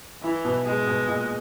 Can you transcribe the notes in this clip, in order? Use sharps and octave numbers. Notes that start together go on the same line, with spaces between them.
E3 E4
B2
B2 G#3
B2
A#2